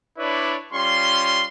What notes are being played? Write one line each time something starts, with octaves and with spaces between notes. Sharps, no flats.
D4 E4 B4 C#5 D5
G3 C#4 F4 C6